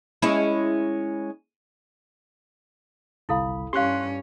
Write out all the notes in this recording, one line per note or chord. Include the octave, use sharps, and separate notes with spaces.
G#3 C#4 E4
G1 C2 E4 A4 F5 B5
G2 C#4 G4 F5 C6 F#6